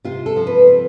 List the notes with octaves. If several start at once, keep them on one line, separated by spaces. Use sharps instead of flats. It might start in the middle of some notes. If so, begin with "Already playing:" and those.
C3 F4
A4
F3
B4
C4